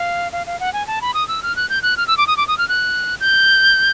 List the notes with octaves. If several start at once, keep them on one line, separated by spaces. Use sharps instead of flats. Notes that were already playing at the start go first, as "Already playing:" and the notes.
Already playing: F5
F5
F5
F#5
G#5
A5
B5
D#6
E6
F6
F#6
G6
F#6
F6
E6
D6
D#6
D6
D#6
F6
F#6
G6